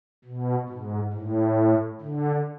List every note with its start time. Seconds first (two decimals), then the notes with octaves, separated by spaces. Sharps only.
0.24 B2
0.69 G#2
1.13 A2
2.01 D3